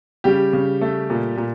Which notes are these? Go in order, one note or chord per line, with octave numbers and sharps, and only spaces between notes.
C#3 G3 G4
C#3
A3
A#2
A#2